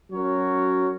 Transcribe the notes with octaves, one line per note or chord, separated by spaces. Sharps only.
F#3 C#4 F#4 A#4 C#5